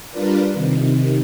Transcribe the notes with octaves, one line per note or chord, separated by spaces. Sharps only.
G3 D4 F4 A#4 B4 D5
C3 D#3